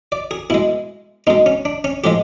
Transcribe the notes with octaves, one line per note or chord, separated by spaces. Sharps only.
D5
G#4
B2 G#3 E4
B2 G#3 D#4
C#4
D4
C#4
A2 F3 G#3 G4